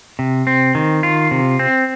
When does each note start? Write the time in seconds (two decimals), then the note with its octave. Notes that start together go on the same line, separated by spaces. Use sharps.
0.19 C3
0.47 C4
0.75 D#3
1.03 F4
1.31 C3
1.59 C4